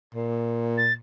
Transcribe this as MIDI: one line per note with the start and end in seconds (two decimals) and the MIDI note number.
0.15 0.99 46
0.78 0.93 93